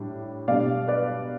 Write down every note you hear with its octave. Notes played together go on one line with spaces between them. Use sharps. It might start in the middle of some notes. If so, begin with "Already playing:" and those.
Already playing: A2 G3 D4
B2 G3 D4 D5 F5
B4 D5